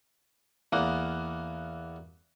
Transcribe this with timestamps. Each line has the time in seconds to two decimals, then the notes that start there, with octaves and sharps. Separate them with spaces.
0.73 E2 A#3 B3